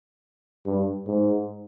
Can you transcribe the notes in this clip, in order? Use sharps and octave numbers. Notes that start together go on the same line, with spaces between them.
G2
G#2